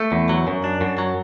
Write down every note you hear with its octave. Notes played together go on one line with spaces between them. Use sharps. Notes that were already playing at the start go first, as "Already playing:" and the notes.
Already playing: A3
E2
F#3
F#2
D4
F#2
F#3